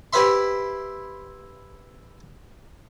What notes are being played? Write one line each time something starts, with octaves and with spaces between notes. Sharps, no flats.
E4 G4 B4 C5 E5 C6